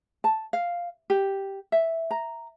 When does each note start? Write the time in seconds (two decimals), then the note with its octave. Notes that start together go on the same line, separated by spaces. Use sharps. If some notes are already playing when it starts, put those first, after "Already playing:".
0.24 A5
0.53 F5
1.10 G4
1.72 E5
2.11 A#5